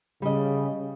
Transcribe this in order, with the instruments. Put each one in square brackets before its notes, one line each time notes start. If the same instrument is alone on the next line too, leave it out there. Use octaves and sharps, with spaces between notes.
[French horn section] C#3 [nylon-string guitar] G3 D#5